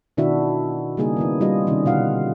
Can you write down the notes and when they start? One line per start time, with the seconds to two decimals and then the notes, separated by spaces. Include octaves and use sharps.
0.17 B2 D#3 D4 E4 F#4 E5
0.97 C#3 G3 A#3 D#4 G#4
1.17 D#3 B3 E4
1.41 G3 F4 D#5
1.67 C3 D#3 C#4
1.85 B2 D3 F4 F5 F#5